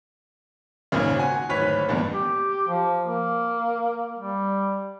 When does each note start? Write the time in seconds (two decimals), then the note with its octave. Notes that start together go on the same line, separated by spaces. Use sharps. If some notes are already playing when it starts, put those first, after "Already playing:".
0.92 G#1 A#2 C#3
1.17 F#4 G#5
1.49 D1 G#1 B4 C#5 B6
1.88 A1 E2 G2 A#2
2.14 G4
2.68 F3
3.07 A#3
4.17 G3